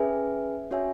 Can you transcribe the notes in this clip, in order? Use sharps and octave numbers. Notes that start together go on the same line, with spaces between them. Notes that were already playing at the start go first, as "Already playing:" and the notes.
Already playing: C#4 G#4 B4 E5 G#5
C#4 F#4 C#5 E5 G#5